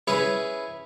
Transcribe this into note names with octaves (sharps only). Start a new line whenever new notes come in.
C#4 E4 G#4 B4 C#5